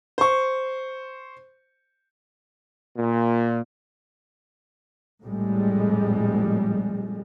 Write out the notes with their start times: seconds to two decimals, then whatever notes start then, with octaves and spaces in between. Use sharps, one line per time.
0.18 C5 C#6
2.98 A#2
5.23 A#1 F2 A2 G3 G#3